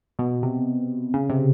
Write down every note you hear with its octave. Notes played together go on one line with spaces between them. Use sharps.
B2
C3
C#3
C3